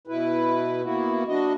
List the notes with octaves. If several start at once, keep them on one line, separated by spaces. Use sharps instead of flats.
B2 E4 B4
A#3 B3 E4 F#4
F#3 D4 F#4 D#5